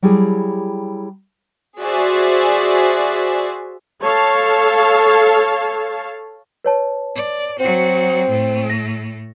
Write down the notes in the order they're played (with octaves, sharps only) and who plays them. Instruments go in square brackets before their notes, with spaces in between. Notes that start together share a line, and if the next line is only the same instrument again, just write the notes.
[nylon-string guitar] F#3 G3 E4 G4 G#4
[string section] F#4 G#4 C5 D5 E5 G#5
[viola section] A4 C#5 F5 A5
[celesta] B4 C#5 A5
[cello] D5
[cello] F#3 F#4 [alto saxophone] C4
[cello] A2 A3
[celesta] A#6